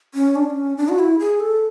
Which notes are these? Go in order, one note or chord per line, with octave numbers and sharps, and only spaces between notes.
C#4
D4
D4
C#4
D4
F#4
E4
G#4
A4